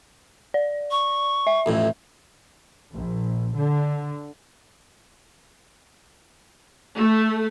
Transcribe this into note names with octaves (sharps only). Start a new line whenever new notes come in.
D5
C#6
E5
A1 F2 A2
A#1
D3
A3